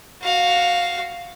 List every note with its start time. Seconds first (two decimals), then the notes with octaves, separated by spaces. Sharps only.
0.22 F#4 F5